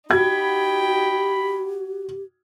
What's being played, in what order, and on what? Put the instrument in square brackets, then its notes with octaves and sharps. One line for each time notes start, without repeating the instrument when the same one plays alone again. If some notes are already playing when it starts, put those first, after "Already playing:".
[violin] D#4 G5 [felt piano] F#4 G#6 [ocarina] G4 [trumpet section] B5